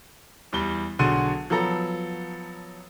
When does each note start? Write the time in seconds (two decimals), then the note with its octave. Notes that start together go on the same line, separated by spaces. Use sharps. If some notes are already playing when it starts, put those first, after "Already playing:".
0.53 E2 G3 G7
0.99 B1 D3 F#4 G#4 C6 D#7
1.50 F3 F#3 B3 A4 A#5